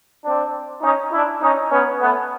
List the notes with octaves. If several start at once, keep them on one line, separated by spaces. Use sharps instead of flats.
C4 D4
C#4 D#4
D4 E4
C#4 D#4
B3 C#4
A3 B3